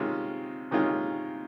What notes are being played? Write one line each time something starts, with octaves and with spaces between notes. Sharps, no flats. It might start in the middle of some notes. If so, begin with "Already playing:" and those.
Already playing: C3 D#3 G#3 C#4 F4
C3 D#3 G#3 C#4 F4